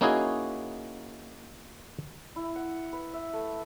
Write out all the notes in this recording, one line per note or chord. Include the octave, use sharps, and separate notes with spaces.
A#3 C#4 D#4 E4 F#4 G#4
E4
F#5
B4
E5
A3